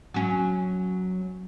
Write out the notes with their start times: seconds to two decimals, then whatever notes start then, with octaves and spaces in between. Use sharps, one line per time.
0.14 F#3 C#4